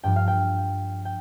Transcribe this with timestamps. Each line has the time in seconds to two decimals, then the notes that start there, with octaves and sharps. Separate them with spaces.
0.04 G2 F3 G5
0.16 F5
0.28 G5
1.05 G5